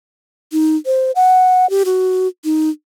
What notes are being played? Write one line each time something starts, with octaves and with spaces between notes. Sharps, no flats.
D#4
C5
F#5
G4
F#4
D#4